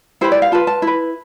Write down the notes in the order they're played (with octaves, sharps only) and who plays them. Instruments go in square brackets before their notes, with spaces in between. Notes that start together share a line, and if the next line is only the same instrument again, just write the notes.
[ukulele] E4 G4 B4 C5
D5
F5
F4 B4 A5
A5
E4
B4